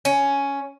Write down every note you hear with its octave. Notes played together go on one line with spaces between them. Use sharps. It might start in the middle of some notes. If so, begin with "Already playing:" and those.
C#4